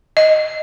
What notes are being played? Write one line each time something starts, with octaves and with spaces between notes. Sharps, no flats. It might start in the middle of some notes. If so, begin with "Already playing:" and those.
D#5